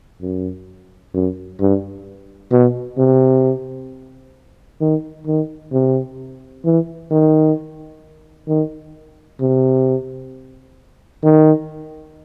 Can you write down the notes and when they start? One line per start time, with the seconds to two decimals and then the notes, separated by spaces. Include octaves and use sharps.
0.22 F#2
1.14 F#2
1.60 G2
2.52 B2
2.98 C3
4.81 D#3
5.27 D#3
5.73 C3
6.65 E3
7.11 D#3
8.48 D#3
9.41 C3
11.24 D#3